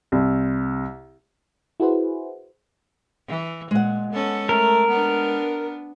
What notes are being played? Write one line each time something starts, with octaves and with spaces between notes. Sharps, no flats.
C2
E4 F#4 G#4 B4 C5
E3
A#2 G#3 F#5
B3 C#4 A4
A3 A#4
B3 D4